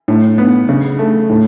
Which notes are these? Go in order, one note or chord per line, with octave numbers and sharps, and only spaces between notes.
A2
B3
C#3
A3
A2